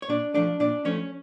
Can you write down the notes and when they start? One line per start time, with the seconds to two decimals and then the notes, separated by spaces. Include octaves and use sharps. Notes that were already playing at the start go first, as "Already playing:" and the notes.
0.02 C#5
0.09 A#2 D4 D5
0.34 F3 A3 D4 D5
0.60 A#2 D4 D5
0.85 F3 A3 C#4 C#5